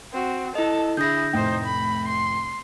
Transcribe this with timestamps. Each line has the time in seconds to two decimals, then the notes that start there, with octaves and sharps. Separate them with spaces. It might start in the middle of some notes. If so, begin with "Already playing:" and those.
0.13 C4 F#4
0.55 E4 A4 D#5 A5
0.97 D3 E4 G#4 G6 A#6
1.33 F1 A2 D#4 C5 G5
1.65 B5
2.08 C6